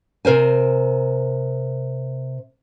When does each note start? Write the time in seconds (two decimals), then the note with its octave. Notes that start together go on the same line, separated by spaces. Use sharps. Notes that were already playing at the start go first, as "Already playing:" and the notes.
0.25 C3 A#4 C5 G#5